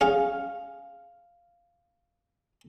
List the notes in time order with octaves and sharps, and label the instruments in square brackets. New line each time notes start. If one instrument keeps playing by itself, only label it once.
[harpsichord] C#4 G#4 F#5 [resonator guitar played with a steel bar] F5